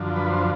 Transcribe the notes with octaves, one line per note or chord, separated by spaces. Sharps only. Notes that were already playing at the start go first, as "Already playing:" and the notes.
Already playing: F#2 D3 F3
B4
C5